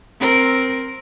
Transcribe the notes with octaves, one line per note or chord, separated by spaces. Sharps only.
C4 A#4